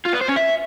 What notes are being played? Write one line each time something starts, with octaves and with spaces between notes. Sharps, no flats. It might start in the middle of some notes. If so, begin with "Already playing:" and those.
F4
B3
C5
C#4
E5